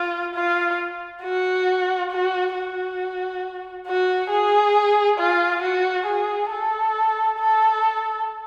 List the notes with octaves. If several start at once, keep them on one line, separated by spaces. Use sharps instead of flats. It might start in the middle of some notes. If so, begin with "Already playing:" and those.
Already playing: F4
F4
F#4
F#4
F#4
F#4
G#4
F4
F#4
G#4
A4
A4